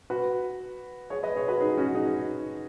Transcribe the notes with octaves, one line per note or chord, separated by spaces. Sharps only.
F#4 B4
G#4 C#5
B4 D#5
G#4 C#5
F#4 B4
D#4 G#4
C#4 F#4
D#4 G#4